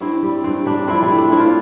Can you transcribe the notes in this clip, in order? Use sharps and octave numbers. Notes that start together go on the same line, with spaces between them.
G2 C4 E4
G3
G2 C4
G3 D4
F3 C4 E4
C4 E4
A3
D4
C4 E4
F4